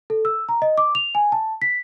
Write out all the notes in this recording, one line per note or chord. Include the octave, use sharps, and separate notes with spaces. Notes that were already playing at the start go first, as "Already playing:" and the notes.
A4
E6
A#5
D#5
D6
F7
G#5
A5
B6